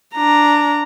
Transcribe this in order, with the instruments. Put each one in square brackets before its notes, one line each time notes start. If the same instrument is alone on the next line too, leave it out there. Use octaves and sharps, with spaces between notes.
[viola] D4 A#5